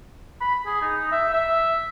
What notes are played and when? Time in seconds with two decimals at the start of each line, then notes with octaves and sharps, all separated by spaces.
0.41 B5
0.66 G#4
0.82 D#4
1.12 E5
1.33 E5